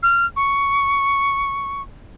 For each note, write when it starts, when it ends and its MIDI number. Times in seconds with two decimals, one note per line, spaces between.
0.03 0.26 89
0.36 1.82 85